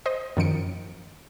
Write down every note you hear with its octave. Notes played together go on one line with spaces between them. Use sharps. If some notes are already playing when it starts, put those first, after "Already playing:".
C5 D#5
F#2 D#3 F3 C#7 D7